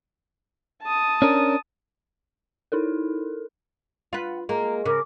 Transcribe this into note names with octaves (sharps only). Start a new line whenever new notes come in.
A5 D#6
C#4 D4 A#4
D#4 E4 A4 A#4
F4 B4 F#5
G#3 A#3 A#5
C#3 A#4 D6